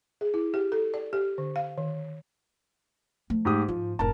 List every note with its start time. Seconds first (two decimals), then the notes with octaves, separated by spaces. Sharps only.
0.21 G#4
0.34 E4
0.54 G4
0.72 A4
0.94 D5
1.13 G4
1.38 D3
1.56 F5
1.78 D#3
3.30 F3 A3
3.45 G#2 G4 D#6
3.68 G#2 F3
3.99 F1 G#2 A#4 A5